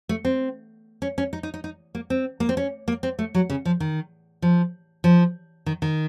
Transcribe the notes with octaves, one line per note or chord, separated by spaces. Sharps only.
A3
C4
C#4
C#4
D#4
D#4
D#4
D#4
A#3
C4
A#3
C4
C#4
A#3
C4
A3
F#3
C#3
F3
D#3
F3
F3
D#3
D#3